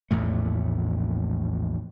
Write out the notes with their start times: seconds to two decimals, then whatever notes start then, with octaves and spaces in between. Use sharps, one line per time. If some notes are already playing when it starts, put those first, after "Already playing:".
0.11 A#1 E2 A2 A3